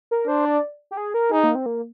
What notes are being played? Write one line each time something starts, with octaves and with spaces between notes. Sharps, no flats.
A#4
D4 C5
D5
G4
G#4
A#4
D#4 G#4
A#3
C4
A#3